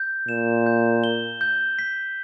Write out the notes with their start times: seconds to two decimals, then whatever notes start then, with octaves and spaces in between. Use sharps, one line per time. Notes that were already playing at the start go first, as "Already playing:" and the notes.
Already playing: G6
0.28 A#2 E7
0.66 G6
1.04 G7
1.41 G6
1.79 B6